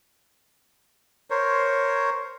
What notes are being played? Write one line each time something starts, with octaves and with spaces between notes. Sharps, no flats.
A#4 C5 C#5